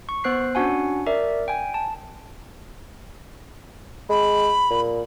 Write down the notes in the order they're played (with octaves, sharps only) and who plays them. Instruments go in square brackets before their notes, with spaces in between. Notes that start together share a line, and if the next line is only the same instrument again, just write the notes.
[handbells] C#6
B3 C5 F#6 C7
C#4 D4 F#4 F#5 G#5
A#4 D5 E5
G5 G#5
A5
[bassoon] G#3 [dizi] B5
[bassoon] A#2